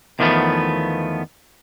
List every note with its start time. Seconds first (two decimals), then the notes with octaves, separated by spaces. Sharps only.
0.19 E2 D#3 F3 A3 B3